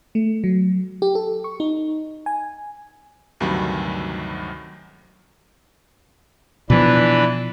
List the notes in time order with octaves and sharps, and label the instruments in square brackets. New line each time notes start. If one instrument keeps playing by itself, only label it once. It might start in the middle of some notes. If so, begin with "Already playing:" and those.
[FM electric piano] A3
F#3
G4
A4
C#6
D#4
G#5
[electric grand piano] D2 G2 C3 D#3 F#3 B5
[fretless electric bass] B2 F3 [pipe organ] E3 D4 B4